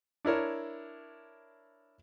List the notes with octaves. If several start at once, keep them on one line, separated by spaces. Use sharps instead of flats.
D4 E4 A#4 C#5